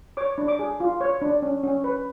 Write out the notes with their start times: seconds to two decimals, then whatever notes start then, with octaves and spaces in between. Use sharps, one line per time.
0.17 C#5 D6
0.38 D4
0.48 D6
0.59 G#4
0.80 F4
1.01 C#5
1.22 D4
1.42 C#4
1.63 C#4
1.84 B4